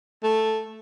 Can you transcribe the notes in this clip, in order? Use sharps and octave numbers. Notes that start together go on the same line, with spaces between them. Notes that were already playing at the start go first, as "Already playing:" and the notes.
A3